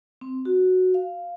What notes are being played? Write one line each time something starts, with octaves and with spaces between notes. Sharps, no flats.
C4
F#4
F5